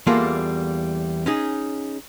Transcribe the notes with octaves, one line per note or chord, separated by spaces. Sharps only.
E2 G3 A#3 F4 G#4 A4
C#4 D#4 G#4